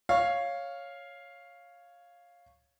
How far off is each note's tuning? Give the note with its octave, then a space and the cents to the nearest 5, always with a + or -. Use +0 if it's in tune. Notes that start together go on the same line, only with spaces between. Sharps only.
C#5 +0 F5 +0